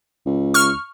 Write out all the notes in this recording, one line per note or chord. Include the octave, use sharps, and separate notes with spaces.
C#2
C#6 F6